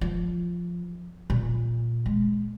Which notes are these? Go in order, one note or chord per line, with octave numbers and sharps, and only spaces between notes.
F3
A#2
G#3